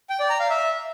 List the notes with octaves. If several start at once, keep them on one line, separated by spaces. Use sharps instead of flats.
G5
D5
A#5
F5
E5